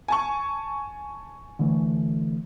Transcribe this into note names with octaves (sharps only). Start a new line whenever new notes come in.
G#5 A5 C#6
D3 E3 A3